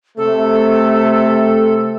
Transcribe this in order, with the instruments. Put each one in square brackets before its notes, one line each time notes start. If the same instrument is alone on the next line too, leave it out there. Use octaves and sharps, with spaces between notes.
[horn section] C3 A3 [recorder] A4